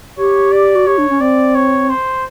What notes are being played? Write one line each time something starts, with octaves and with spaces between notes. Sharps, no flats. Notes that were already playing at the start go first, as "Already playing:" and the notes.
G4 C#5
D5
F#4
G4 C#5
D4
C#4
C4 D5
C#5
C5